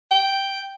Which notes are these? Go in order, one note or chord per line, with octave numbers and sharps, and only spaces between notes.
G5